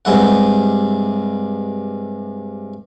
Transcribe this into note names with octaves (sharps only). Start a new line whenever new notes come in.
G2 C3 G#3 E4 F#5